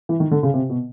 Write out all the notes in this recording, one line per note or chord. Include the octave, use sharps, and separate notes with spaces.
E3
D#3
D3
C#3
C3
B2